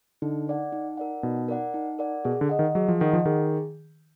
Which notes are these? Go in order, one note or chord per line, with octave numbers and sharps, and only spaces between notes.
D3 D#4
A#4 D5 F#5
D#4
A#4 D5 F#5
B2 D#4
A#4 D5 F#5
D#4
A#4 D5 F#5
B2 G#4
D3
D#5 F#5
D#3
F#3 G#4
F3
D#3 D#5 F#5
F3
D#3 G#4